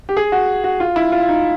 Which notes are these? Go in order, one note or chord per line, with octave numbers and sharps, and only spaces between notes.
G4
G#4
F#4
F#4
F4
E4
F4
D#4